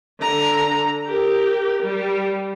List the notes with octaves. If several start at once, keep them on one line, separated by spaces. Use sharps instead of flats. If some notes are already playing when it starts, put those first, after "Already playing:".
D3 A#5
G4 A#4
G3